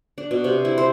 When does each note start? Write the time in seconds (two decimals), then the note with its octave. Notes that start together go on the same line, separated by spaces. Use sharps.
0.18 D4
0.31 B2
0.44 C3
0.65 E4
0.78 C5